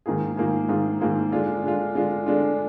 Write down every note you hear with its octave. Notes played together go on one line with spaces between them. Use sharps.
G#2 D#3 A#3 F4 G#4
G#2 D#3 A#3 F4 G#4
G#2 D#3 A#3 F4 G#4
G#2 D#3 A#3 F4 G#4
D3 G#3 D4 F4
D3 G#3 D4 F4
D3 G#3 D4 F4
D3 G#3 D4 F4